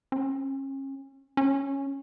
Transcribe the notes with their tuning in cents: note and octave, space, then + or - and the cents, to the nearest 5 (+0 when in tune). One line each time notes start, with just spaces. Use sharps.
C#4 -35
C#4 -5